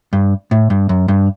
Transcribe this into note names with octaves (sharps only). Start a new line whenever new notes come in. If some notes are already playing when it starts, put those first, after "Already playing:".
G2
A2
G2
F#2
G2